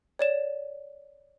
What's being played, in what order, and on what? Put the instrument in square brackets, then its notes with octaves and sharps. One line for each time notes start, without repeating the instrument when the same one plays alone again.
[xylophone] C#5 D5 E7